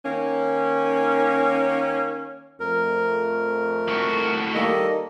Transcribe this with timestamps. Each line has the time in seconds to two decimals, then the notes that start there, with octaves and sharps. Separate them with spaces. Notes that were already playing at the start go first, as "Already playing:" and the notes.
0.05 D#3 A#3 C#4
2.60 F2 A3 A#4
3.88 A2 F#4
4.54 D#3 G3 A#3 A4 D#5